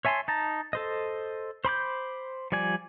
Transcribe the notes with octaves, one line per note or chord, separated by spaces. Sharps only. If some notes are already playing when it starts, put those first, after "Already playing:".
C#5 E5 G#5 A5 C6
D#4 A5 A#5
A4 C5 D#5
C5 B5 D6 G6
F3 G3 D5 G#5